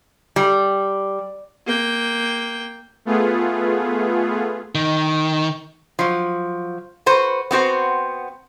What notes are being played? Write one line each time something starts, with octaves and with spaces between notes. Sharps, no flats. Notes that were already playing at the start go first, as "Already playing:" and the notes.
G3
A#3 G5
A3 B3 F4 G#4
D#3
F3 F#3
F#4 B4 C5
B3 C4 F#4 C5